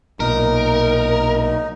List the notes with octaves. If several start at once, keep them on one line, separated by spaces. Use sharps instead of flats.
B1 A#2 D#4 A#4